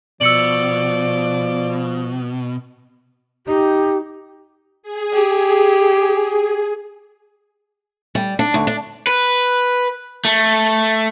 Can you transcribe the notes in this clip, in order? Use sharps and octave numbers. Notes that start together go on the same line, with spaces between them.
B2 F3 D5 E6 C#7 F#7
D#4 G4
G#4
G4
G3
D4
D2
D4
B4
A3